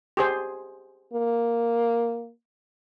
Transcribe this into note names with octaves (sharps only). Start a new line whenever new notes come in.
G4 G#4 C5
A#3